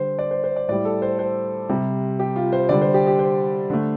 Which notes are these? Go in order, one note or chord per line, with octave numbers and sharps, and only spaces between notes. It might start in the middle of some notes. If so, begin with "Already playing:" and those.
Already playing: D3 G3 C5
D5
C5
C5
D5
A2 G3 D5
A4
C5
C5
C3 G3
G4
F4
C5
D3 G3 D5
C5
G4
G4
C5
D3 A3